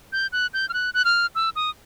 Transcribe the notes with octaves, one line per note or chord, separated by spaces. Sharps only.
G6
F#6
G6
F6
F#6
F#6
F6
E6
D#6